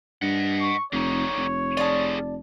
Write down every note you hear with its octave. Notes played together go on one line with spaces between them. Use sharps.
G2 D#5 F#5
C#6
F1 D3 D#4 C#5
F1
F4 G#4 D5 A5